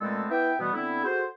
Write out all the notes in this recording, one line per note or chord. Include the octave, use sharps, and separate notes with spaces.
A#2 G#3 A3 B3 C4 A4
B3 E4 E5 G5
B2 E3 G3 A3 B3
D3 B3 C4 E4
F#4 G#4 A4 C5